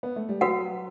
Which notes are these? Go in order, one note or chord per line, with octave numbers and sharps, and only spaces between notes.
B3
A3
G3
F#3 F#4 B4 F#5